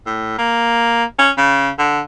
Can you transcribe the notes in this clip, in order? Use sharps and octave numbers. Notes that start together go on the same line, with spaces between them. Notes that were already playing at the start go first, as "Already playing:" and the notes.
A2
A#3
C#4
C#3
D3